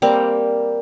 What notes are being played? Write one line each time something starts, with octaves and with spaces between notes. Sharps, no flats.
G3 A#3 C4